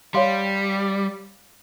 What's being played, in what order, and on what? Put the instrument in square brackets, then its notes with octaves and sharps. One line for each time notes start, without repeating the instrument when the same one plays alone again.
[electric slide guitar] G3 [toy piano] C#5 F5 C6